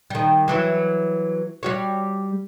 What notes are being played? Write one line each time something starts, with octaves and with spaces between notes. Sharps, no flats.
D#3 G3
E3 F#3 E4
G3 F#4 C#5